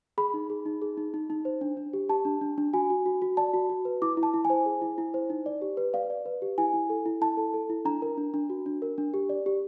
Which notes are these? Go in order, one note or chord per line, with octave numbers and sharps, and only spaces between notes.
G#4 B5
D#4
G#4
D#4
G#4
D#4
D#4
D#4
C5
D4
D4
G4
G4 A5
D4
D4
D4
F#4 G#5
F#4
F#4
F#4
D5 A5
F#4
F#4
B4
E4 D6
E4
A5
E4
G#5
C5
G#4
E4
E4
C5
D#4
D5
G4
B4
D5 F5
D5
B4
G4
E4 G#5
E4
A4
E4
E4 A5
A4
A4
E4
D4 A#5
A#4
D4
D4
F#4
D4
A#4
D4
G4
D5
G4